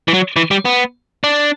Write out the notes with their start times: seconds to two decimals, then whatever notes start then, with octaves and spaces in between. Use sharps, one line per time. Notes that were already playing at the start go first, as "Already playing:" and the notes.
0.08 E3
0.14 F#3
0.36 E3
0.51 G3
0.65 B3
1.24 D4